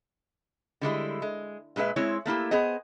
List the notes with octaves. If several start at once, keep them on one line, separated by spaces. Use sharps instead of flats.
D3 G3 G#3 E4
G#3
A#2 G#3 D#4 B4 E5
G#3 C4 E4 C#5
A3 A#3 E4 G4
B3 G#4 C5 D#5